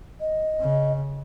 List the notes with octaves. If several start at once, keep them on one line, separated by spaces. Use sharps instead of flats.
D#5
C#3